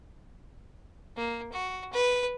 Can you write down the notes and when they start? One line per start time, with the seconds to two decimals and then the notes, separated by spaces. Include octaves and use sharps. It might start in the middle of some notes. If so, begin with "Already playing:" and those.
1.16 A#3
1.52 F#4
1.93 B4